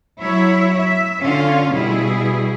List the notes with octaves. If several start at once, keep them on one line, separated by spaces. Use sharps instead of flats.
F#3 E4 C#5 E5
E5
D3 C#4 F4 F5
B2 G3 E4 G#4